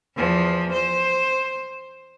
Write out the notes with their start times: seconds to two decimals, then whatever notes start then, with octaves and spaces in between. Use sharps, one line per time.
0.16 E2 F3
0.73 C5